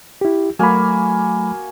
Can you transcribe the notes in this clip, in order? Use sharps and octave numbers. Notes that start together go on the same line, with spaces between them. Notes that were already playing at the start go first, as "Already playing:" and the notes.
E4 G4
F#3 A3 A#3 F#4 G#5 B5